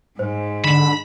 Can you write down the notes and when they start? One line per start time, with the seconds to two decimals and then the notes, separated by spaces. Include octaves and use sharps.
0.19 G#2 C5
0.64 D3 B5 E7